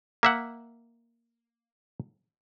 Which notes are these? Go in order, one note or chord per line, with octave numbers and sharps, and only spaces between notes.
A#3 E5 F#5